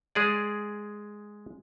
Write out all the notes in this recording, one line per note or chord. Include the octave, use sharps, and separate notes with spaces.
G#3 G#4 D5